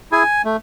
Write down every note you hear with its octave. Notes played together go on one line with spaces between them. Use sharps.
E4 G#4 G#5
A3